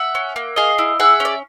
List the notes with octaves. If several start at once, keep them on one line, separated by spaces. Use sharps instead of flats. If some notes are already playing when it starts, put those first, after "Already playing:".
Already playing: E5 F#5
C#4
A#3
G#4 D#5 F5
E4
G#4 E5 F#5
C#4
D5